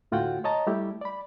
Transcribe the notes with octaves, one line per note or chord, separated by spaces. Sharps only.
D2 A2 F4 F#4 F#5 G5
C#5 D#5 A5 A#5
G3 A3 E4 G4
D5 B5